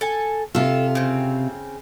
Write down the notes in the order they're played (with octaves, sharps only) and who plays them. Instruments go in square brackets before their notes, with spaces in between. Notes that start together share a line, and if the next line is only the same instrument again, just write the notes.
[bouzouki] A4 G#5
[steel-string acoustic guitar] C3 F4 [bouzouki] A4
[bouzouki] C#3 C4